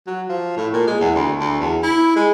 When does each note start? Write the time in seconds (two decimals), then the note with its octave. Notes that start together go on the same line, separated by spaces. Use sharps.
0.07 F#3
0.29 F3
0.57 A2
0.74 A#2
0.87 G#3
1.00 E2
1.16 D2
1.41 D2
1.61 E2
1.83 E4
2.16 G#3